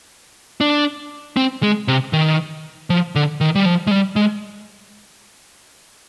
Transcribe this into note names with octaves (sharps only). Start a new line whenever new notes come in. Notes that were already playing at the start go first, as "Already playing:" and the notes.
D4
C4
G#3
C3
D#3
F3
D3
D#3
G3
F3
G#3
G3
G#3